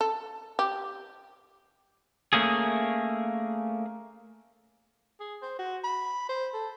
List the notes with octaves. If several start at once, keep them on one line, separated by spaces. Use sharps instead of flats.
A4
G4
A3 A#3 C#4 G#4
G#4
C5
F#4
B5
C5
A4